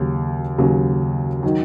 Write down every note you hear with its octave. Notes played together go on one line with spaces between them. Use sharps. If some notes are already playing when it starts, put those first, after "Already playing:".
Already playing: D#2 C#3 F#3
D#2 C#3 F#3
D#3 F#3